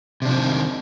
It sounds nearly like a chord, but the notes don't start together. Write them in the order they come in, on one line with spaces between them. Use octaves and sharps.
C3 D4 F3 C4 D#3